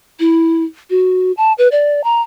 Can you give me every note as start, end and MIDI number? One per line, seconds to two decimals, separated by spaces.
0.20 0.63 64
0.90 1.32 66
1.37 1.53 81
1.58 1.68 71
1.72 2.04 74
2.04 2.21 82